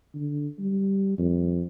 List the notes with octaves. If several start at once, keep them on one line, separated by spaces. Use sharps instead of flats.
D3
G3
F2